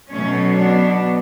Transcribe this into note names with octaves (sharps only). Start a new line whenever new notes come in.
B2 F#3 A3 C#4
B3 D4